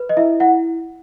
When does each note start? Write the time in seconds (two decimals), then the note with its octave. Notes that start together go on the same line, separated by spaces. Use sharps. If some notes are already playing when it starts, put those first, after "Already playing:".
Already playing: B4
0.09 D#5
0.17 E4 E5
0.40 E4 F#5